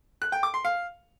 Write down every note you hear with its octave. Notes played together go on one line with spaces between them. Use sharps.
F#6
G5
D6
C6
F5